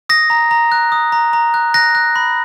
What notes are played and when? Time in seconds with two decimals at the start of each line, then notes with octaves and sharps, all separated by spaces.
0.09 D#6 A#6
0.30 A#5
0.51 A#5
0.72 F#6
0.92 D#6
1.12 A#5
1.33 A#5
1.54 F#6
1.74 F#6 A#6
1.95 F#6
2.16 B5